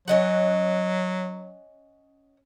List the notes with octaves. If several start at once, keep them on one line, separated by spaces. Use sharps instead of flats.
F#3 C#4 D#5 F#5